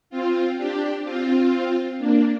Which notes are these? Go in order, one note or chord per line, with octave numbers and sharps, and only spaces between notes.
C4 F4
D4 G4
C4 F4
A#3 D4